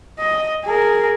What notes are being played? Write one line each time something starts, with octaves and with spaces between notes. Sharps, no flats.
D#5
G#4 A#4